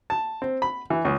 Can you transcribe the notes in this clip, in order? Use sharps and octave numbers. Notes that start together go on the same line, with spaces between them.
A5
C4
B5
E3
C#2